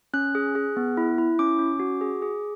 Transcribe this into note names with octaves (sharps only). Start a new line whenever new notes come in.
C#4 F#6
G#4
G#4
B3
E4
E4
C#4 D6
C#4
F#4
G#4
G#4